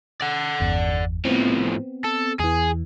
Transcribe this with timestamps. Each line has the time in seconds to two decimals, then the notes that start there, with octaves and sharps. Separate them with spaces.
0.21 D5 F#5
0.60 G1 E2
1.25 A2 F3 B3 C4
2.04 A4
2.39 E2 E3 G#4